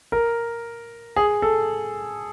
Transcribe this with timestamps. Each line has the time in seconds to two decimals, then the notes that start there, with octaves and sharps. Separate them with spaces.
0.12 A#4
1.16 G#4
1.42 A4